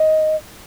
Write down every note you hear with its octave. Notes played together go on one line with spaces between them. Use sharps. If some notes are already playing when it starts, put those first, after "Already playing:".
Already playing: D#5